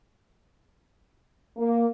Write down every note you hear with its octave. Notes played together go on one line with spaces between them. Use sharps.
A#3